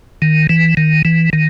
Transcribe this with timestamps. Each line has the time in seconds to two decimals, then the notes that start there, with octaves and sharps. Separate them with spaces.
0.22 D#3
0.49 E3
0.77 D#3
1.05 E3
1.33 D#3